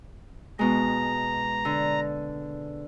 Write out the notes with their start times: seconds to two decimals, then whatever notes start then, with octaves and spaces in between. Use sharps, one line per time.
0.59 B2 G#3 A#5
1.65 D3